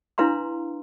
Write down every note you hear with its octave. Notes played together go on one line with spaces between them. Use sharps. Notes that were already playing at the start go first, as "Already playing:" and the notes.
D4 E4 B4 F5 A#5 C6